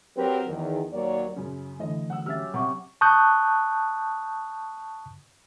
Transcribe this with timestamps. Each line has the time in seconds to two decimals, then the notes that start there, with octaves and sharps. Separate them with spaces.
0.17 F#3 C4 G4 A#4 B4 C#5
0.48 E2 D#3
0.93 D#2 F#3 A#3 C#5 D5
1.36 F#2 C#3 C#4
1.79 D3 E3 A3 E4 D#5
2.10 F#3 F#5 E6
2.26 F#3 C#4 G4 E5 E6 F6 A6
2.54 C3 E5 F#5 C#6 D6
3.01 A5 C#6 D#6 F#6 G6